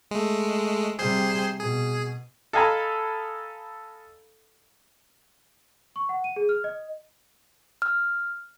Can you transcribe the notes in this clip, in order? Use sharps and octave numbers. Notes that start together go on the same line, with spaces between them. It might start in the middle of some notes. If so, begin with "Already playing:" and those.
G#3 A3
C3 G3 G#4 C5 C6
B2 G#4
A4 D#5 F5 G#5 A#5 B5
C#6
F#5
D#7
G#4
F6
D#5
F6